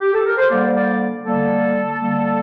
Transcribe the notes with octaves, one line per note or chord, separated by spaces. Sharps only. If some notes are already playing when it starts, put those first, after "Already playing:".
G4
A4
A#4
C5
D3 G3 A#3 D5
D5
D3 G3 A#3 A4
D3 G3 A#3